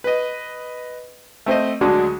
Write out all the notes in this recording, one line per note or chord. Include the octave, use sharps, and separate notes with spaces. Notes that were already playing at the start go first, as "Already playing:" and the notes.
B4 D#5
A3 C4 C5 D#5
D2 D3 F#3 G#3 D4